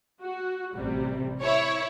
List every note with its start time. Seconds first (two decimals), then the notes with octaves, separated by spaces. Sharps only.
0.22 F#4
0.76 A1 C3 G3
1.43 E4 C#5